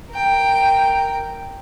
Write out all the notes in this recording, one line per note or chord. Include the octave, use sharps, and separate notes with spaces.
A#4 G5